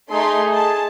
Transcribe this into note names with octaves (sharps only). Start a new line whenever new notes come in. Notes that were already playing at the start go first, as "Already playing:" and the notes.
A3 D#4 G#4 C6
A5